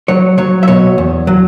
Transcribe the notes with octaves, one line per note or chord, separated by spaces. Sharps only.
F#3 C#5
F#3 C#5
E5
B2 C#5
E2
F#3